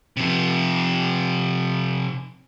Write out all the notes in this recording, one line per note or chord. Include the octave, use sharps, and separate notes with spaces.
C3 F3